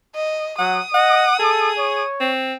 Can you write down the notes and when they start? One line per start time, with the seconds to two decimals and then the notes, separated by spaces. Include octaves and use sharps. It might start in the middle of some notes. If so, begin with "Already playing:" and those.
0.15 D#5
0.59 F#3 F#5 D#6
0.94 D#5 F#5
1.40 G#4 A4
1.78 C#5
2.21 C4